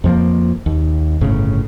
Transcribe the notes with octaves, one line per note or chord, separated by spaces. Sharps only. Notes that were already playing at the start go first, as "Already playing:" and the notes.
F2 F3 A#3
D#2
G1 A2 C#3